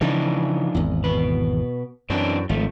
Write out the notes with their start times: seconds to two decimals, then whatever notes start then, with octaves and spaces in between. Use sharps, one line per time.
0.01 C#3 E3 F3 D4 D#4
0.75 G#1 E2
1.04 B2 B4
2.10 F#2 E3 C4 D4
2.49 G#1 F3 A3